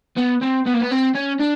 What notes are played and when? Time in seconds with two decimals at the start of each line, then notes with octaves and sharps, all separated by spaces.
0.16 B3
0.41 C4
0.66 B3
0.74 A#3
0.81 B3
0.91 C4
1.15 C#4
1.39 D4